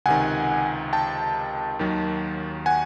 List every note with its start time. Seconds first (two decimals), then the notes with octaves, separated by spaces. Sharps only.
0.06 C#2 C3 D#3 F#5 G#5
0.93 G5 A5
1.79 D#2 D#3 F#3
2.66 F#5 G#5